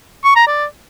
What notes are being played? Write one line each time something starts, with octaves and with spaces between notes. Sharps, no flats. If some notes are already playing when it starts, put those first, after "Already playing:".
C#6
A#5
D5